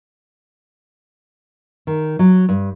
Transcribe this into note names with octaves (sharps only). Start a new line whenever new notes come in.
D#3
F#3
G2